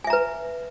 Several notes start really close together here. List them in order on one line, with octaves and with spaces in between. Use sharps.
G#5 E5 A#5 B4